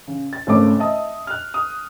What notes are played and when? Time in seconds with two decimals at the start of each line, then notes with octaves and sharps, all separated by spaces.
0.07 C#3
0.33 A6
0.47 G#1 C#3 A3 C#4 D6
0.79 D#5 E5 A5 D#6
1.27 F6 F#6
1.54 D#6